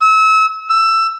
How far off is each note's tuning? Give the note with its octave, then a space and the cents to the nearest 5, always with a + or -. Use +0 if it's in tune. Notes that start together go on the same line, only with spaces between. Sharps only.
E6 -30
E6 +15